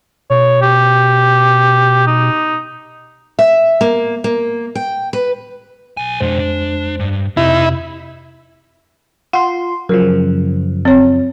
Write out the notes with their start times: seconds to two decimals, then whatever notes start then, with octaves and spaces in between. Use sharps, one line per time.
0.30 B2 C#5
0.62 G4
2.07 D#4
3.39 E5
3.81 A#3
4.24 A#3
4.75 G5
5.13 B4
5.97 B1 G#5
6.20 F2 B2 G#3 D4 C5
6.39 D4
7.00 G2
7.37 F2 C3 D#4 E4
9.33 F4 F#5 C6
9.89 F#2 C#3 F3 A#4
10.85 C4 C#5